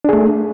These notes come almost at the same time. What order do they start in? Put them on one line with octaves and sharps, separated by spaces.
D4 G#4 A3